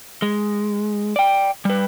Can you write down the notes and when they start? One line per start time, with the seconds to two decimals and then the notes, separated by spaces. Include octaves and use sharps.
0.22 G#3
1.16 D5 G5
1.65 G3 B4